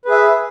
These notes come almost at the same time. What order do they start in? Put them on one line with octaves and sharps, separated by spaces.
B4 G#4 E5